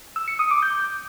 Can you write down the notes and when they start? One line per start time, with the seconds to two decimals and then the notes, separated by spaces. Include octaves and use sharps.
0.16 E6
0.28 C#7
0.39 D#6
0.51 D6
0.62 G6